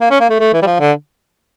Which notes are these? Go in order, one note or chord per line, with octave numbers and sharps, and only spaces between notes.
A#3
C#4
A#3
A3
A3
E3
G3
F3
D3